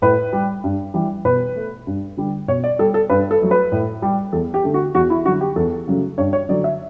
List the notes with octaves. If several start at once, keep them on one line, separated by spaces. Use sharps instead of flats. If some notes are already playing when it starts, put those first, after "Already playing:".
A2 B4
G3
G2
E3 G3
B2 B4
A3
G2
D3 G3
B2 C#5
D5
G3 A4
A4
G2 B4
A4
F#3 A3
B4
A2
G3
E2 A4
G4
D3 A3
F#4
E2 F#4
E4
D3 F#3 F#4
G4
E2 A4
C#3 F#3 A3
G2 C#5
C#5
D3 F#3 A3 D5
E5